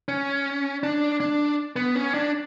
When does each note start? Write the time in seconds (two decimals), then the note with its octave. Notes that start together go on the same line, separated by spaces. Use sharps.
0.08 C#4
0.83 D4
1.20 D4
1.76 B3
1.95 C#4
2.14 D4